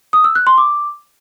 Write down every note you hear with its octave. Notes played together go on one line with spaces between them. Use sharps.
D#6
E6
F#6
C6
D6